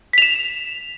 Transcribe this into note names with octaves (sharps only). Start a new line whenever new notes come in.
B6 E7 F7